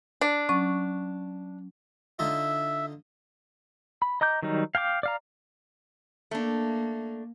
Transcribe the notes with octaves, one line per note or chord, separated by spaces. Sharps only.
D4
F#3 C#4 C#6
D3 D#4 F4 E5
B5
D#5 A#5 D6 G6
D#3 F#3 G3 D#4
F5 G5 G#5 D6
D5 F5 A#5
A3 A#3 D4